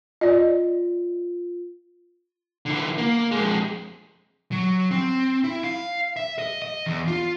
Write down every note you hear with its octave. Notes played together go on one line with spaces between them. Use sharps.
F4 D5 D#5
D3 E3
A#3
F2 G#3
F#3
C4
E4
F5
E5
D#5
D#5
E2
F4